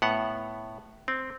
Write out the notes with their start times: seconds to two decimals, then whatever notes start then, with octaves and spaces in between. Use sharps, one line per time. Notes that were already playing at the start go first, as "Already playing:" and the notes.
0.02 A2 B3 F#5
1.08 C4